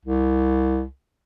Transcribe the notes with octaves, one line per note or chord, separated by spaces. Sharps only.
C2